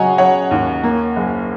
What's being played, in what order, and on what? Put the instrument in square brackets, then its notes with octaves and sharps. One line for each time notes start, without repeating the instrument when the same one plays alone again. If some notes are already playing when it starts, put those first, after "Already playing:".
Already playing: [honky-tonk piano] C#3 F#3 C#5 D#5 F#5 G#5
F#3 C#5 F#5
D#2
A#3
F#1